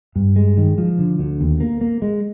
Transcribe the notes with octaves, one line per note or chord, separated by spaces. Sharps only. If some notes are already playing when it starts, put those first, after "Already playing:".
G2
G#3
D#3
F3
D3
D2
D#2
A#3
A#3
G#3